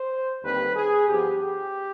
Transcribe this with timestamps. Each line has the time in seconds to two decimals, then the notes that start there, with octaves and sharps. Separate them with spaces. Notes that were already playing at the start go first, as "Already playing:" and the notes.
Already playing: C5
0.42 D#2 D3 G3 C4 B4
0.76 G#4
1.08 G2 F3 B3 G4
1.40 G4